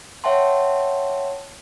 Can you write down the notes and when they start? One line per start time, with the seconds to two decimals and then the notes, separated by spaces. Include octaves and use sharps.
0.24 C#5 E5 F#5 G5 A5 C6